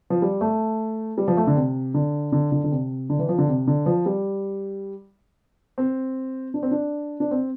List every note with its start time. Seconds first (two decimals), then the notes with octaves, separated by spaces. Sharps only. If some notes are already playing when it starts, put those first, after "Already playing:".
0.10 F3
0.22 G3
0.41 A3
1.18 G3
1.28 F3
1.37 A3
1.47 D3
1.56 C3
1.94 D3
2.32 D3
2.52 D3
2.64 D3
2.71 C3
3.10 D3
3.19 E3
3.29 F3
3.38 D3
3.48 C3
3.67 D3
3.86 F3
4.06 G3
5.78 C4
6.54 D4
6.63 C4
6.71 D4
7.20 D4
7.31 C4